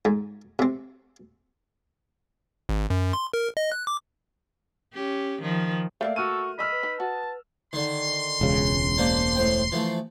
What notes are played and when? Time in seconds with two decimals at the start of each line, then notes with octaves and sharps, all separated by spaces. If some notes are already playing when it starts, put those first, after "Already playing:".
0.05 G#2
0.59 C3 C4
2.69 G#1
2.90 F#2
3.13 C6
3.34 A#4
3.57 D#5
3.72 F#6
3.87 D6
4.94 C#4 G4
5.42 D#3 F3
6.01 A3 A#3 D5 E5 F5
6.16 F#4 A4 C#6 F6 D#7
6.59 D#5 B5 E6 F6
6.72 B4
6.83 D#4
7.00 F#4 A5
7.73 D3 D#3 C6
8.41 E1 C#2 C#3
8.98 A#3 D4 C5
9.36 A2 C5 G5
9.72 E3 F3 A3